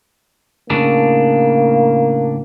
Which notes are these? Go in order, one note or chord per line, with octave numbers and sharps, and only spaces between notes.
A2 C#3 A#3 D4